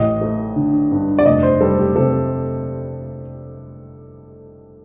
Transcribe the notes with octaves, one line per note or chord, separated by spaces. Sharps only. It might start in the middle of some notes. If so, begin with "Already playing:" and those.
Already playing: A1 D#5
A3
D3
G2
D5
F1 D#5
C5
G3 A4
G4
C3 A4